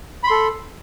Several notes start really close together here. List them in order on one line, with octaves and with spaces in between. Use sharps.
B5 C6 A4